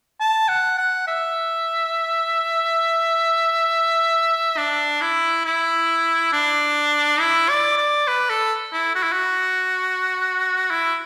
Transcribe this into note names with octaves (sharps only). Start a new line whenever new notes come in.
A5
F#5
F#5
E5
D4
E4
E4
D4
E4
D5
D5
B4
A4
E4
F#4
E4
F#4
E4